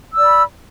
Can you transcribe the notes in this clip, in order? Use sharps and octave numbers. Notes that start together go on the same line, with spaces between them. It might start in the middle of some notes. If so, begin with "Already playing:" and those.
D5 B5 E6